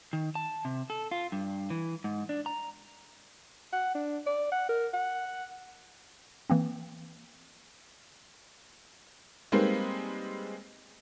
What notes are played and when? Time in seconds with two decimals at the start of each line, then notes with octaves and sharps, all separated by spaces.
0.13 D#3
0.35 A5
0.65 C3
0.90 A4
1.11 F4
1.32 G2
1.70 E3
2.04 G#2
2.29 D4
2.46 A#5
3.73 F#5
3.95 D4
4.26 D5
4.52 F#5
4.69 A#4
4.93 F#5
6.50 E3 A#3 C4
9.52 G3 G#3 A#3 C4 D#4 B4